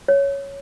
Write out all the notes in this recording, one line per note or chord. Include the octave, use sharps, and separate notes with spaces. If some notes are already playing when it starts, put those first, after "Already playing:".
C#5